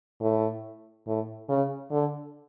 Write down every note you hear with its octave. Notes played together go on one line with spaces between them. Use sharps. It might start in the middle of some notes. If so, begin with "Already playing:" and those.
A2
A2
C#3
D3